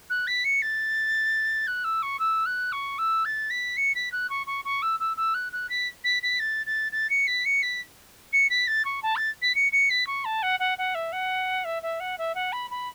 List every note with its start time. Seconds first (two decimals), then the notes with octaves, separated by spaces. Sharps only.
0.10 F#6
0.27 B6
0.44 C#7
0.62 A6
1.67 F#6
1.84 E6
2.02 C#6
2.19 E6
2.46 F#6
2.72 C#6
2.98 E6
3.25 A6
3.50 B6
3.77 C#7
3.95 B6
4.12 F#6
4.30 C#6
4.47 C#6
4.65 C#6
4.82 E6
5.00 E6
5.17 E6
5.34 F#6
5.52 F#6
5.70 B6
6.04 B6
6.23 B6
6.40 A6
6.66 A6
6.92 A6
7.10 C#7
7.27 B6
7.45 C#7
7.62 B6
8.33 C#7
8.50 B6
8.67 A6
8.85 C#6
9.03 A5
9.16 A6
9.42 B6
9.55 C#7
9.72 C#7
9.90 B6
10.07 C#6
10.25 A5
10.43 F#5
10.60 F#5
10.78 F#5
10.95 E5
11.12 F#5
11.65 E5
11.83 E5
12.00 F#5
12.18 E5
12.35 F#5
12.52 B5
12.71 B5